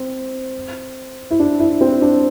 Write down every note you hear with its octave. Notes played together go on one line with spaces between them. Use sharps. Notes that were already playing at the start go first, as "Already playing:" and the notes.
Already playing: C4
E4
D4
E4
C4
D4